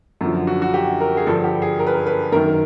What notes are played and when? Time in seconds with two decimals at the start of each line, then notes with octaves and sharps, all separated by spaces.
0.21 F#2 D3 F3
0.47 F#4
0.62 F#4
0.74 G4
1.01 A#4
1.17 G#4
1.27 G2 D3 F3 A4
1.44 G4
1.62 G#4
1.79 A#4
1.87 B4
1.94 A#4
2.07 B4
2.32 F#2 A#4
2.36 D#3